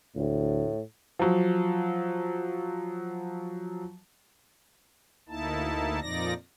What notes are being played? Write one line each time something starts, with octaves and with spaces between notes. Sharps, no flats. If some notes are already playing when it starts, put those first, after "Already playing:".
D2 A2
F3 F#3
D2 A#3 D#4 E4 A5
F2 A#2 F3 D#4 D5 A#6